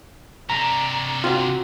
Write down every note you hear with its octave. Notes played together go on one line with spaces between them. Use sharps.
C3 D4 A#5
C4 F4 F#4